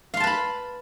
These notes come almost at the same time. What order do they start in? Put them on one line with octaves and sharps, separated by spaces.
F5 C6 A5 B4 B5